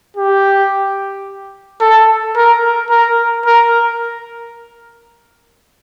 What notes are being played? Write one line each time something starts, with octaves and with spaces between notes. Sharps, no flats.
G4
A4
A#4
A#4
A#4